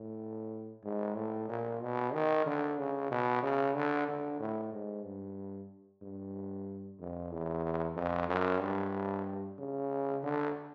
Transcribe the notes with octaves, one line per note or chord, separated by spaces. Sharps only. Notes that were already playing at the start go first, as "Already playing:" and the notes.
Already playing: A2
G#2
A2
A#2
B2
D#3
D3
C#3
B2
C#3
D3
D3
A2
G#2
G2
G2
F2
E2
F2
F#2
G2
C#3
D3